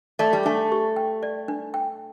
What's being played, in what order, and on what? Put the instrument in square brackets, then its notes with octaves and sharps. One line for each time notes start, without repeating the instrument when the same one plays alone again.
[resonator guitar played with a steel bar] A3 [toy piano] D5
[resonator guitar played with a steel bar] G3
[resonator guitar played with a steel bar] A3 [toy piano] D4
[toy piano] G4
G5
D5
D4
G5